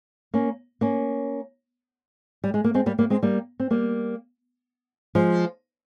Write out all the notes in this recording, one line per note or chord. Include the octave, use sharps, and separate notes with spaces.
A#3 C#4
A#3 C#4
G3
G#3
A#3
G#3 C4
G3 A#3
G3 A#3
G#3 C4
G3 A#3
C4
G3 A#3
F3 G#3